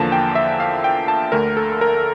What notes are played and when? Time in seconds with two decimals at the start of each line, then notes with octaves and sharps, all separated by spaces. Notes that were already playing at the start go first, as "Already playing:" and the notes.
Already playing: E2 D3 F3 A#3 A5
0.12 G5
0.35 E5
0.60 F5
0.84 G5
1.08 A5
1.32 D2 D3 A3 A#4
1.57 A4
1.81 A#4